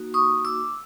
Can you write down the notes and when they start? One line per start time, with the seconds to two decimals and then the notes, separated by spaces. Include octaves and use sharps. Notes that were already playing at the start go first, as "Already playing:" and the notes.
Already playing: A#3 D#4 F#4
0.14 C#6 D#6
0.45 D6 E6